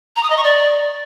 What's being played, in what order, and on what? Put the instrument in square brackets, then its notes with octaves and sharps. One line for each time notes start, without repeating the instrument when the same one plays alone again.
[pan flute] A#5
D#6
D#5
C#6
D5